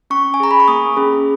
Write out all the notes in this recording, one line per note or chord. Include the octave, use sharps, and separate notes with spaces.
C#4 C#6
G#5
G#4 A#5
B5
C#6
A#3 D#6
C#4 G#4